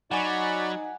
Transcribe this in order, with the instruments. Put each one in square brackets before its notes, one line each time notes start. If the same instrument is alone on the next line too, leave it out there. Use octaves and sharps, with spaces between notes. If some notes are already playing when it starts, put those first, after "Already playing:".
[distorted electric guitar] F#3 [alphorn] D#4 [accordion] D5 B5 C#6 [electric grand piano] F#5 G#5 D6